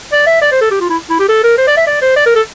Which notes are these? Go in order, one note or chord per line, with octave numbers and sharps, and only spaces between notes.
D5
E5
D5
C5
A4
G4
F4
E4
E4
G4
A4
A#4
C5
D5
E5
D5
C5
D5
A#4
A4